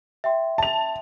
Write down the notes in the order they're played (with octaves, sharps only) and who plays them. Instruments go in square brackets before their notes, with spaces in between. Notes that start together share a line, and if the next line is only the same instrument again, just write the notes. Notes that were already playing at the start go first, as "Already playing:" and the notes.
[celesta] E5 G5 C6
[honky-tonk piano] A5 F7